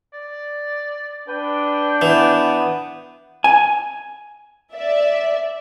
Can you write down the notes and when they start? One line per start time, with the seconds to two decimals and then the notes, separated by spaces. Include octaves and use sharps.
0.13 D5
1.28 D4 B4 G5
2.02 E3 B3
3.44 G#5
4.74 D5 E5